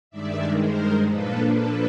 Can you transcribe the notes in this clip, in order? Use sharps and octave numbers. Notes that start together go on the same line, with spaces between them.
G2 D#3 G#3 D5 E5
A#4 C5
A#2 F3 A#3 D4 A4 B4
A4 B4